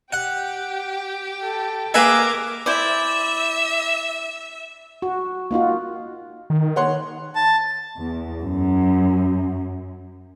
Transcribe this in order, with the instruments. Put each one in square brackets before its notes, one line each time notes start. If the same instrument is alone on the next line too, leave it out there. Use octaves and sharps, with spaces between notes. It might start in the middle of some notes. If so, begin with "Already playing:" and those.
[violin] G4 G5 [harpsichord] F#5
[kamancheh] A4
[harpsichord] A#3 B4 E5 [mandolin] G#4 [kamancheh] A#4 D6
[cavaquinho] E4 C5 D5 [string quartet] E5
[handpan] F#4
A#3 D#4 F4 F#4
[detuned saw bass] D#3
[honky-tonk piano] C#5 F#5 C6
[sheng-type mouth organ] A5
[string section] E2
F#2